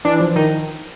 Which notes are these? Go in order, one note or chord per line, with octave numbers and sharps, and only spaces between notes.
E3 D4
F3
D#3 D#4